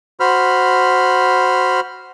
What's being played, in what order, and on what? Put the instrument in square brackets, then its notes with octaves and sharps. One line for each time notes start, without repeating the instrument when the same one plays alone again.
[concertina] F#4 C5 B5 F6